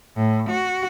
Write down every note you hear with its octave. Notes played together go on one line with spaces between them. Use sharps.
A2
F#4